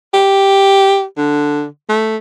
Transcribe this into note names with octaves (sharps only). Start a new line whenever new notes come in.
G4
D3
A3